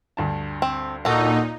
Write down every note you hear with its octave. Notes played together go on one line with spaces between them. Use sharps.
D2 G2 A5
C4
A#2 D#4 F#4 A4